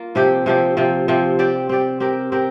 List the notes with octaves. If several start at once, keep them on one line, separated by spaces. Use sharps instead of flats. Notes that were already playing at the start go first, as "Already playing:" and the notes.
Already playing: A#3 F4
C3 F3 C4 G4
C3 F3 C4 G4
C3 F3 C4
C3 F3 C4
C4 G4 D5
C4 G4 D5
C4 G4 A#4
C4 G4 A#4